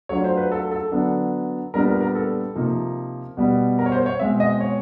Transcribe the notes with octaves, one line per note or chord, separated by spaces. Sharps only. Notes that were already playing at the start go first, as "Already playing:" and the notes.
F#3 A3 D4 F4 C#5
C5
B4
A4
A4
D3 F#3 B3 D4
A#2 G3 B3 D4 A#4
A#4
A#4
A4
C3 F3 A#3 D#4
B2 G3 B3
A#4
C#5
C5
C#5
B2 G#3 C4 E5
D#5
C#5